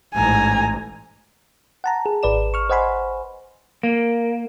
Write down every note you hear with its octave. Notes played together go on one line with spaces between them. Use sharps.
A1 G#2 G#5 A#5
F#5 A5 A#5
G#4
G#1 B4 D5 E7
C#6 F6
C5 D#5 F#5 G#5 B5 C6
A#3